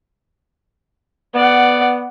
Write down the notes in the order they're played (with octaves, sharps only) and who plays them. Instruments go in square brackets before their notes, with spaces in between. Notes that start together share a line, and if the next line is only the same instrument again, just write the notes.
[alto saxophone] B3 [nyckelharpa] D5 F#5